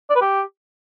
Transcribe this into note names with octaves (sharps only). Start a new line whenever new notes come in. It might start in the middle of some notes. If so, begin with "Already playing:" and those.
D5
B4
G4